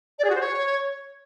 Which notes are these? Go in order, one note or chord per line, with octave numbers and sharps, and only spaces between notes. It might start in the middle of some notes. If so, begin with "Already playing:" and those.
D5
G#4
F#4
C5
C#5